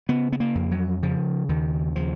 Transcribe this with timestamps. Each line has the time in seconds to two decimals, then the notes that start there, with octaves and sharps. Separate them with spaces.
0.09 C#3 B3
0.32 B3
0.40 A#3
0.55 F2
0.71 F#3
1.02 C#3 F3
1.49 D#2 D#3
1.96 C#3 F3